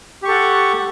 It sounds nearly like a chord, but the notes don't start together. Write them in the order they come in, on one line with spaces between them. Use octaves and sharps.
G4 C#6 A4 F#5